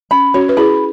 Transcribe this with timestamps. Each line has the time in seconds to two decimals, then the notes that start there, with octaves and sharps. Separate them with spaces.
0.11 C#4 B5
0.34 C#4 F#4 C#5
0.49 B4
0.57 E4 G#4 B5